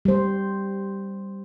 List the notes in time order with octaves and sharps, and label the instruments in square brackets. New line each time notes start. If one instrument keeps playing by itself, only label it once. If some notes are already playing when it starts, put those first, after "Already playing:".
[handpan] G3 C5